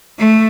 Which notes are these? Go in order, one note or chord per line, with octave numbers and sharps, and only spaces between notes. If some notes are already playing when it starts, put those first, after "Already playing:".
A3